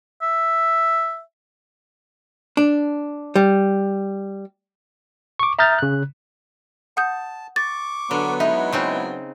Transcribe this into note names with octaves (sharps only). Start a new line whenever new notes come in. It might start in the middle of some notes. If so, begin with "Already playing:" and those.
E5
D4
G3
C#6 D6
E5 A#5 D#6 F6 G6 A6
C#3 F#6
F#5 A5 D#6 G6
C#6 D6 A6
D3 F#3 B3
G#3 D#4 E4 E5
C#3 C4 D#4